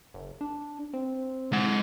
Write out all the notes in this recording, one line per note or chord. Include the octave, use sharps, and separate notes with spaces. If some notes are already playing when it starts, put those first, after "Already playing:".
F#1
D4
C4
G#3 F#5